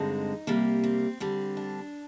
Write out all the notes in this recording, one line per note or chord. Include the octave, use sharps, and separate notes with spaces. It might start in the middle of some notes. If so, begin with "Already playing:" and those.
Already playing: G2 D3 G#3 C4 D#4
C3 G3 A#3
C4
D3 G3 C4
D4